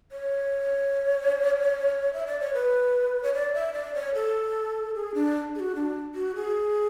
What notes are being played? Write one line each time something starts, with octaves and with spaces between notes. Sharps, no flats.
C#5
E5
D5
C#5
B4
C#5
D5
E5
D5
C#5
A4
G#4
D4
G#4
F#4
D4
F#4
G#4